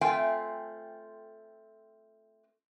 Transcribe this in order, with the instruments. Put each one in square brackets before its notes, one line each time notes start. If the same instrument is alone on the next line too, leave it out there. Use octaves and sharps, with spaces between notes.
[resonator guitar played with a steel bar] A3 C4 F4 G5 G#5